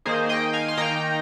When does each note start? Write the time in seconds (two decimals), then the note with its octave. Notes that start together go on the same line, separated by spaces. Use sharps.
0.06 D#3 A#3 D#4 G#4 C5
0.29 D#5 G5
0.53 F5 G#5
0.68 C6
0.77 D#3 A#3 D#4 G5 A#5